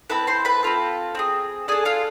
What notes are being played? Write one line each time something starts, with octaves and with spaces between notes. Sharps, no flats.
C4 E4 A4 B4 B5
C5 C6
B4 B5
C4 F4 A4
C4 E4 G#4
D4 G#4 A4 G#5
F4 F5